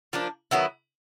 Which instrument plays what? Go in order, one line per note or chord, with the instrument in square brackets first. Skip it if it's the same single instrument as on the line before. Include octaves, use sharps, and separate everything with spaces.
[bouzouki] F3 A#3 D4
D#3 F#3 B3 E4